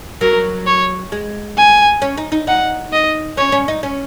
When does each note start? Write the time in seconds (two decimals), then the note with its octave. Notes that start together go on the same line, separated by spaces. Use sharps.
0.21 F#3 A#4
0.66 C#5
1.12 G#3
1.58 G#5
2.02 C#4
2.18 D#4
2.32 D#4
2.47 D#4 F#5
2.93 D#5
3.37 C#4 C#5
3.52 C#4
3.68 D#4
3.83 C#4